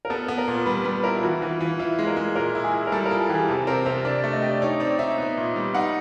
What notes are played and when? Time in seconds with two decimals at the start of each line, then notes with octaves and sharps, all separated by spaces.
0.05 A#4
0.10 B3 A4
0.28 B3
0.38 A#4
0.48 A#2
0.66 G3 B4
0.85 G3 B4
1.04 E4 A#4
1.17 F4
1.23 E3 F#4
1.42 E3
1.51 F4
1.60 E3
1.79 E4 F4
1.99 G#3
2.07 A#4
2.17 G#3
2.35 A#2 A#4
2.55 E4
2.64 G#4
2.74 E4
2.87 A#4
2.92 G3 A4
3.06 A#4
3.11 F4
3.20 A4
3.29 E3 G4
3.34 G#4
3.48 C3 A4
3.67 C4 A#4
3.86 C3 A#4
4.05 D4 D5
4.24 A3
4.33 D#5
4.42 G4
4.50 D5
4.62 D#4 C#5
4.80 C4 D5
4.99 D#4 E5
5.18 B3
5.37 A#2
5.56 G3
5.74 D#4 F#5